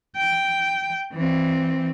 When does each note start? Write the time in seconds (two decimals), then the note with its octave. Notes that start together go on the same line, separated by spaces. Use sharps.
0.17 G5
1.13 E3 C4